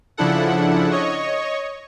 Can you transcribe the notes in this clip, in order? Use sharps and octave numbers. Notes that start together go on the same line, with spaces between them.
C#3 F3 D4 E4 A4 F#5
C#5 D#5 C#6